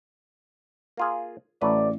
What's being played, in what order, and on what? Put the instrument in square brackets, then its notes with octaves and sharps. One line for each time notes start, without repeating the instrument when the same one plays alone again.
[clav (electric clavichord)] A#3 F4 G#4
[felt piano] A1 [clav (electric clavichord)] F#3 A3 B4 [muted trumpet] D5